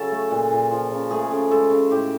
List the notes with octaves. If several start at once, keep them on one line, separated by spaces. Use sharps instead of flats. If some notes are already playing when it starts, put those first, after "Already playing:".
Already playing: C#3 F#3 A4
A3
A#2
A#2
F3
C#3
A3 G#4
C#3
G#3 A4
C#3
A2 G4